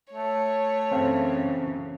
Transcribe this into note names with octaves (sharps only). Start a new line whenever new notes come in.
A3 C#5
F#2 C#3 E3 C4 A4 F5